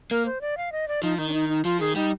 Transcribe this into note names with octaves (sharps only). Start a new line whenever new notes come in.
A#3 A#4
C5
D5
F5
D#5
D5
F3 D#4
D#3 D#4
D4
D#4
D#4
F3 F4
D#3 G#4
G3 D#4